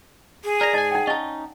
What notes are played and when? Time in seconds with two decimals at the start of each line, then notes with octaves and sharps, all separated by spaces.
0.44 G#4
0.61 A#4 D5 A#5
0.73 G#2 D#5 G#5 A5
0.91 D#4 F#5 G5
1.07 C#4 D#4 D#5 F5 A5